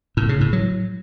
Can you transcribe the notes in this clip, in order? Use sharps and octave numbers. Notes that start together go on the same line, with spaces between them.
A2
C#3
A2
F#3